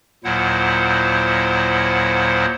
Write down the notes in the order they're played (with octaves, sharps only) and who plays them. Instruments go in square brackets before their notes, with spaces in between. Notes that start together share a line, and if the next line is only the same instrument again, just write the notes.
[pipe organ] D#2 A#2 F#3 E4 C5 F#5